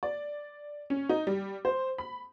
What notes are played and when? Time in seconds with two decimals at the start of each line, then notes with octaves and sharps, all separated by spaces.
0.03 D5
0.90 C#4
1.09 D#4
1.27 G3
1.65 C5
1.98 B5